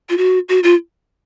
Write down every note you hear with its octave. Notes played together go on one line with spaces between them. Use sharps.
F4
F#4
F#4
F4